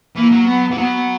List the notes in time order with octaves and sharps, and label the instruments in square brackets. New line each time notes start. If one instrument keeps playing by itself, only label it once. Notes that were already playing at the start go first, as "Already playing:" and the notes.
[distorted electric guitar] E3 [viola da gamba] A#3
[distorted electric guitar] F#3
[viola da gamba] B3
[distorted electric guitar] E3
[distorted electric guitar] F#3 [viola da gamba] B3